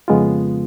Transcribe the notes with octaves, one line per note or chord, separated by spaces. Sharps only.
F2 C#3 G#3 B3 F4